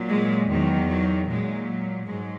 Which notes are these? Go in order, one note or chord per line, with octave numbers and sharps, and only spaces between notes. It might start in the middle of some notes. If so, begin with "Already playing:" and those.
Already playing: A#2 F#3
G#3
E2 D#3 F#3
F#3
A#2 F#3 G#3
G#2 F#3 G#3